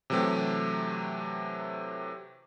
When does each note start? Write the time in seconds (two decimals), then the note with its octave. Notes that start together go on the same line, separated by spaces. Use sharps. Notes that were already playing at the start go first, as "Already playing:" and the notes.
0.10 C3 E3 F#3 A3 C4 G4